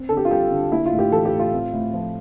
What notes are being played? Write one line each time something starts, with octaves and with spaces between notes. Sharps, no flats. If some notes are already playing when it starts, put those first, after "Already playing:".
Already playing: C4
D3 A4
G4
F4
G3 G4
D3
A#3 E4
F4
A2
G4
E3 A4
G4
A2
F4
C4
A2
F3